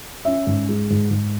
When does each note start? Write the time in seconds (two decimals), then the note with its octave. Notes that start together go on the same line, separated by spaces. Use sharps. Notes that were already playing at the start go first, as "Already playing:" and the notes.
0.25 C#4 E5
0.47 G#2
0.69 G#3
0.90 G#2
1.11 G#2